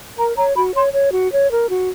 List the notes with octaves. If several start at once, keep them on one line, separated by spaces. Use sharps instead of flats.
A#4 A#5
C#5 A#5
F#4 B5
C#5 C6
C#5
F#4
C#5
A#4
F#4